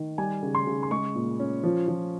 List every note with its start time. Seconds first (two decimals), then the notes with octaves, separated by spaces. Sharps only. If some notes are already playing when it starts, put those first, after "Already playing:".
Already playing: D#3
0.18 G3 G#5
0.43 C#3
0.55 C6
0.67 C#3
0.83 C6
0.91 G#3 C#6
1.15 A#2
1.40 C#4
1.64 F3
1.88 F3